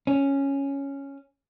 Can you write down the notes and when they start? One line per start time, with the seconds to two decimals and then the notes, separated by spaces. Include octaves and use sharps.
0.07 C#4